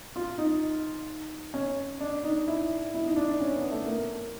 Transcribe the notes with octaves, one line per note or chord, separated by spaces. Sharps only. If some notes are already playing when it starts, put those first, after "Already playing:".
F4
D#4
C#4
D4
D#4
E4
E4
D#4
D4
D4
C#4
B3
A3
A#3